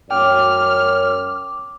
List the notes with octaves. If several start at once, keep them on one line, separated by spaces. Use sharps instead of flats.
F#2 C#5 G5 D6 F6